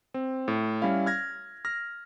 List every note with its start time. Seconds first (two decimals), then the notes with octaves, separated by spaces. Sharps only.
0.14 C4
0.48 A2
0.82 G3 C#4 E4 F5
1.06 F6 G#6 A#6
1.65 F6 A#6